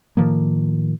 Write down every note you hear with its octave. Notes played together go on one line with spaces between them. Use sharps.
A2 D#3 F3 A#3